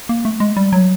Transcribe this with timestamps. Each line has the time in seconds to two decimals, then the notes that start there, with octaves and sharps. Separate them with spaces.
0.09 A#3
0.25 A3
0.40 G#3
0.57 G3
0.73 F#3